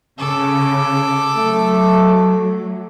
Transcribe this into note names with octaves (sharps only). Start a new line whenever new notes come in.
C#3 A4 D6
F#3 A3